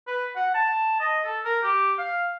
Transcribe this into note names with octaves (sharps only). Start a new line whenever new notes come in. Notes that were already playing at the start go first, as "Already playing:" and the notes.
B4
F#5
A5
D#5
A4
A#4
G4
F5